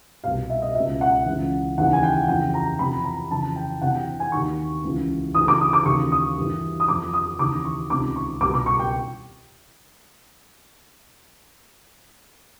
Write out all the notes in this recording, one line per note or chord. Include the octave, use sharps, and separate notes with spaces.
C2 B2 F5
E5
D#5
C#2 B2 E5
F#5
C#2 C#3 E3
D#2 C#3 E3 F#5
G#5
G5
F2 C#3 E3 G5
A#5
F2 C3 E3 B5
A#5
F2 C#3 E3 A5
G5
D2 C3 E3 F#5
G5
G#5
D#2 D#3 C#6
C#2 C#3 E3
D2 C#3 E3 D#6
D6
D#6
D6
D#2 C#3 E3 C#6
D#6
G2 E3
D#6
F2 D3 D6
D#6
D#2 C#3 E3 D6
C#6
C#2 C3 D#3 D6
C#6
C2 B2 D6
D6
C#6
G5